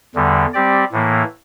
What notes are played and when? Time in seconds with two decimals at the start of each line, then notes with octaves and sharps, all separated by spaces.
0.15 E2 D3 G3
0.53 G3 C4 G4 D5
0.92 A2 E3 A#3